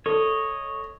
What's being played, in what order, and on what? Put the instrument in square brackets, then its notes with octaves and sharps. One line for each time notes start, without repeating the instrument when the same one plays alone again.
[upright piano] A4 [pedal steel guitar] C#5 D#5